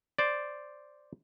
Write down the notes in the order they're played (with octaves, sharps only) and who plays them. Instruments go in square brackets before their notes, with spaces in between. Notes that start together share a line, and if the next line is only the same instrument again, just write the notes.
[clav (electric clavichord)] C5 D5